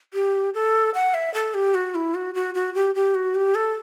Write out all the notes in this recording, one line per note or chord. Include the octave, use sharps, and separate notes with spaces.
G4
A4
F#5
E5
A4
G4
F#4
E4
F#4
F#4
F#4
G4
G4
F#4
G4
A4